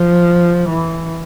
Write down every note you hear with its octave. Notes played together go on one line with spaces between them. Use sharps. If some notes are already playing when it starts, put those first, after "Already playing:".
Already playing: F3
E3